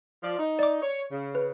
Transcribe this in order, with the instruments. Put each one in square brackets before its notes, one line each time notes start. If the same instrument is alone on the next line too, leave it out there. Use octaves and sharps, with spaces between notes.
[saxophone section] F3 D5
D#4
[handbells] D5 D6
[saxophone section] C#5
C#3
[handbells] B4